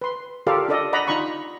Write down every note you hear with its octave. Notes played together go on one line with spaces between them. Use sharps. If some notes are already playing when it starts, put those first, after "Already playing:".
B4 C6
F4 G4 A4 A#4 D5 F5
D4 G4 A4 D5 D#5
D5 D#5 F#5 A#5 B5
D#4 F4 A#5 B5 C#6